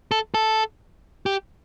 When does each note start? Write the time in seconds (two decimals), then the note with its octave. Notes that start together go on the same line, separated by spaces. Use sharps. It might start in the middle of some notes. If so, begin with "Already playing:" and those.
0.11 A4
0.34 A4
1.26 G4